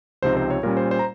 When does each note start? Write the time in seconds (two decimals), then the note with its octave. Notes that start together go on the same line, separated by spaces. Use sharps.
0.22 C#2 C3 F3 C4 D#4 C5
0.37 C5
0.50 C#5
0.63 A#2 G3 C#4 A#4
0.77 C5
0.91 C5
0.99 A#5